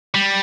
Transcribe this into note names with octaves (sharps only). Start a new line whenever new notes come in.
G3